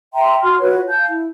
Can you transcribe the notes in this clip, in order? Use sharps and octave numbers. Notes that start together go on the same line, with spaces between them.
E5 G5 A#5 C6
F#4 C6 F6
F4 F#4 B4 C#5
F5 A5 G6
E4